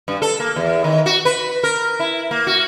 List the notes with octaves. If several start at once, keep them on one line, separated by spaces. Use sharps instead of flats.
G2
A4
A#3
E2
D#3
F#4
B4
A#4
E4
A#3
F#4